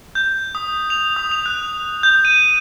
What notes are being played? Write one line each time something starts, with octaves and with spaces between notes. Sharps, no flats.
G6
D#6
F7
D#6
F7
F#6
G6
D#7